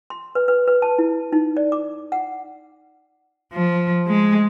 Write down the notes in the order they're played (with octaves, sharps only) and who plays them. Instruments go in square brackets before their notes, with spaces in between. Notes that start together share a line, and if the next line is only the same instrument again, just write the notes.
[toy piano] C6
B4
B4
B4
A5
E4
D#4
D5
D6
F#5
[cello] F3
G#3